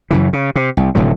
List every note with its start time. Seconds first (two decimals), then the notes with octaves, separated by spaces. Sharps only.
0.11 F#2 C#3 E3
0.33 C#3
0.56 C3
0.77 C2
0.95 F1 A2 D3 F#3